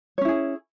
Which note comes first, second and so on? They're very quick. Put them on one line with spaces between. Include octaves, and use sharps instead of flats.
C#5 C#4 E4 G#4